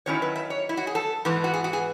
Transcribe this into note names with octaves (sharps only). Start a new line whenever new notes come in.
D#3 F#3 C#4 E4 C#5
B4
E5
C#5
E4
F#4
G#4
A4
G#2 E3 B3
F#4
G#4
F#4
G#4